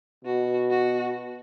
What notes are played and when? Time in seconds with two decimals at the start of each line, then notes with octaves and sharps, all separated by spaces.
0.25 B2 F#4
0.70 F#4